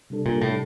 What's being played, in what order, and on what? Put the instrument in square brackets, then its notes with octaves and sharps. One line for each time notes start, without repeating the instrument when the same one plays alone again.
[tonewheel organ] C3 G3 D4 A4
[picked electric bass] A#2
A2